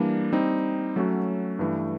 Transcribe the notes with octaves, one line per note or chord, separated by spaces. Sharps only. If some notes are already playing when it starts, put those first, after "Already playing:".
Already playing: E3 G3 A#3 D4
G3 C4 D#4
F#3 A3 C#4 F#4
G2 E3 A3